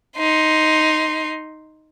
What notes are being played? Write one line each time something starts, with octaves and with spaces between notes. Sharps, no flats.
D#4 C6